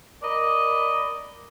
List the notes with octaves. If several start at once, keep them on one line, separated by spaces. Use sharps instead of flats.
A#4 D5 D#5 B5